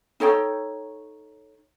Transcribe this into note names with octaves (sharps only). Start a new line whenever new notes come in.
D#4 A4 C#5 G5